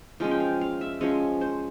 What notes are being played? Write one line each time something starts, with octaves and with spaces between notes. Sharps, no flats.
F3 G#3 C#4 F5
G5
F5
F5
E5
F3 G#3 C#4
C5